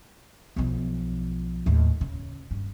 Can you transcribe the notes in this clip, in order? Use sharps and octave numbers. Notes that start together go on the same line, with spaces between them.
B1 F3
D#2 A2
C#3
G2